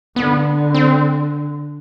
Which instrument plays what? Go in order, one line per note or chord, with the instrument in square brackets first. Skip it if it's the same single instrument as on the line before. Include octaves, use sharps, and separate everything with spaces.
[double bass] D3 [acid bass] B3
[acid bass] C4